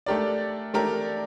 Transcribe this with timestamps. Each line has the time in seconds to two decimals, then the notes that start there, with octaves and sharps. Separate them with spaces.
0.06 A3 D4 G4 A#4 D5
0.74 A3 D4 G4 A#4 D5